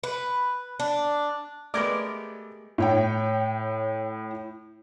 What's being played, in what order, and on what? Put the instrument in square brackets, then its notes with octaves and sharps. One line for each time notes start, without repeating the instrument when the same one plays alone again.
[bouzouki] B4
D4
[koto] G#3 G4 A#4 [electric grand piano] A3 G#6 A#6 [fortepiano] B3 D5
[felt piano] A2 C#5 G5